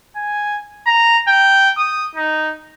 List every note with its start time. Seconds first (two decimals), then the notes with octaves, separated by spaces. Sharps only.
0.16 G#5
0.86 A#5
1.28 G5
1.78 D#6
2.15 D#4